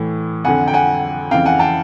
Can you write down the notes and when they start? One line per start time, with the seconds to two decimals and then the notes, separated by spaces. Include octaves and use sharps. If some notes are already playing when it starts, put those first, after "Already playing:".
Already playing: A2 E3
0.45 F2 D3 F#5 G#5
0.68 G5
0.74 F#5 G#5
1.31 F2 C#3 E3 F5 G5
1.46 F#5 G#5
1.59 G5 A5